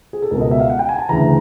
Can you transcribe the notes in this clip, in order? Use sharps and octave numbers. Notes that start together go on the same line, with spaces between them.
G#4
A4
C#2 B2 A#4
D#5
E5
F5
F#5
G5
G#5
A5
D2 C#3 E3 A#5